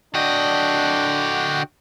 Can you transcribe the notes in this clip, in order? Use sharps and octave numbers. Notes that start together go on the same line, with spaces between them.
D3 D4 F#4 D#5 G5